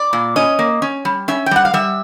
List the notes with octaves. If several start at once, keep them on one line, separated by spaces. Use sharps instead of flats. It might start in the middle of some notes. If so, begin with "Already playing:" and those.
Already playing: D5
A#2
C#4 D#5
A#3
C#4
G3
C#4 E5
G5
G3 F#5
F5
G3 E5